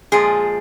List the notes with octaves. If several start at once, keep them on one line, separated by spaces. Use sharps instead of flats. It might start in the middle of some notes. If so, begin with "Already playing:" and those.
A#2 F3 G#3 G#4